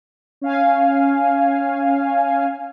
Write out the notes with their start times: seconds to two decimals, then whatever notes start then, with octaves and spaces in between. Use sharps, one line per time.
0.41 C#4 F5 G#5